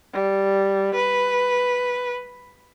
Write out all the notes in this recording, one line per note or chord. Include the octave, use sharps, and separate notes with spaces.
G3
B4